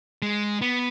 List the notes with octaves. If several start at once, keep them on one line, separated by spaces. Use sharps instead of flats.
G#3
B3